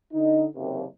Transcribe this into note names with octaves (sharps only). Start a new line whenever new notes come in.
D3 D#4
F#1 D#2 C3